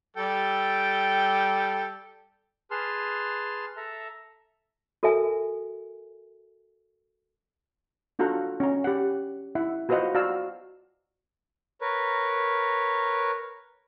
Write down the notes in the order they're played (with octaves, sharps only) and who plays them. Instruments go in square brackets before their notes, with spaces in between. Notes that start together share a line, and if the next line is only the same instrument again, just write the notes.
[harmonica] G3 A4 G5
[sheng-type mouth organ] G#4 B4 A5 C6 F6
A4 E5 A5 A#5
[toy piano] F#4 A4 A#4 E5 G#5
[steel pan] D4 F4 F#4 A4 F#5 A#5
C#4 A#5
G4 F#5
E4 E5 F#5
F4 F#4 B4 C5 D#5 F#5
F#4 D5 F5 A#5 E6
[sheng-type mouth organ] A#4 B4 C#5